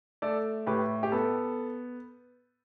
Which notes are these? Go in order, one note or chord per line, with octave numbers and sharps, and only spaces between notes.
A3 A4 D5
A2 G4 B4
G4
B3 A4